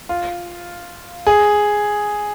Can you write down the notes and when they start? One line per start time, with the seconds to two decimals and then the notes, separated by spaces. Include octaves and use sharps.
0.09 F4
1.27 G#4